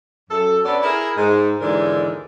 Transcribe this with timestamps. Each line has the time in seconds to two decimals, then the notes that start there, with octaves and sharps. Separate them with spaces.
0.30 F#2 A4
0.64 B3 C#4 D4 A4 B4 D5
0.83 E4 G#4 A#4
1.16 G#2
1.60 D#2 G#2 D3 E3 G#3 A#4